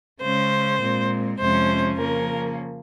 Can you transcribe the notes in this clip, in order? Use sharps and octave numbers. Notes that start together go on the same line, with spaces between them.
C#3 G#3 C#4 C5
A#2 G#3 C4
F2 C3 F3 G#3 C#4 C5
C#3 F3 A#3 C#4 A#4